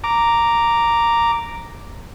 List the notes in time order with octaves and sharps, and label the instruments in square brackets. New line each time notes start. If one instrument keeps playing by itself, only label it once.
[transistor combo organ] A#5 D6